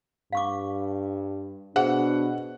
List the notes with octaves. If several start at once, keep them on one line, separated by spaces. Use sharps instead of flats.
G2 F5 C#6 D6
B2 D4 G#4 C5 F#5